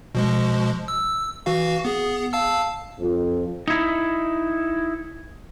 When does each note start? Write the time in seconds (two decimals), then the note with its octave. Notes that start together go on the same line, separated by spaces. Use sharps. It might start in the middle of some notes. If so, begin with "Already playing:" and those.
0.15 B2 F3 G#3
0.88 E6
1.46 E3 F#4 F5
1.85 B3 G#4
2.33 F5 A5 E6
2.99 F2
3.68 D#4 E4